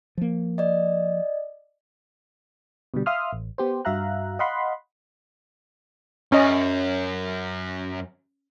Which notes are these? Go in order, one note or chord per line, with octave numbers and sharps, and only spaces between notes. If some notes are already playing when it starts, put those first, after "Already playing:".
F3 A#3
D5 D#5
B2 D3 G3
E5 F5 C6 D#6 F6
A1
B3 G4 C5
G2 F#4 E5 F5 A#5 F#6
D#5 F5 F#5 B5 C6
F#2 C#4 D#5